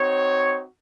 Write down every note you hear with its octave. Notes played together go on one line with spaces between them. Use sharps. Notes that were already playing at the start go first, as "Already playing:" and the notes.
Already playing: C4 D#4 F#4 C#5